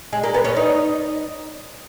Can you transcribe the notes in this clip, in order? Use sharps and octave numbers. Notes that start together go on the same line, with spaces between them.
G#3
A#3
B3
C#4
D#4